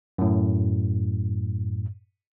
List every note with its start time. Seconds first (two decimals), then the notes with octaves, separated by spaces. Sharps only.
0.18 F#2 A2